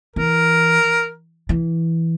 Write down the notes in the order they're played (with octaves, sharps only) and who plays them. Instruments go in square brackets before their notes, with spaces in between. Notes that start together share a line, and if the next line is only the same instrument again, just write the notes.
[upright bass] E3 [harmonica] A#4
[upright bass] E3